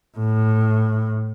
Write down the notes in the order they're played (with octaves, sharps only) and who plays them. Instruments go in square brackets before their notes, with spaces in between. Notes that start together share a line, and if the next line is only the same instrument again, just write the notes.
[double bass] A2